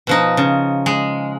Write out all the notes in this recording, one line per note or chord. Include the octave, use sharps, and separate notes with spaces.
B2 F3 D#4
C#3
G#3